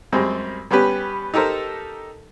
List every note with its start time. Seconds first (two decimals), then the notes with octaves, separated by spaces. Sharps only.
0.12 F#2 G3 G#3 C4
0.71 G3 B3 C#4 G4 B4
1.34 D#4 G4 A4 A#4 C5